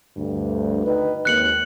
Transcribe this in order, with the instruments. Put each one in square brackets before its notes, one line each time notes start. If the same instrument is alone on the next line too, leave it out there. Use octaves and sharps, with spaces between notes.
[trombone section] D2 G2
D#3 B4
[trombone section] G#1 D#2 [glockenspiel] F#6 C#7 F#7